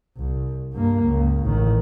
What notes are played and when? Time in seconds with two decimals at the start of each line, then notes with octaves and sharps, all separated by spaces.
0.17 C2
0.73 G2 A#3
1.04 C#2
1.45 A1 D#3